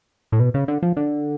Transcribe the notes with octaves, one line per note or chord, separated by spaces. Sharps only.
A2
B2
C#3
D3
F3
D3